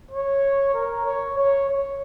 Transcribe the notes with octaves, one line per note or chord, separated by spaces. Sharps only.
C#5
A#4
C#5
C#5
C#5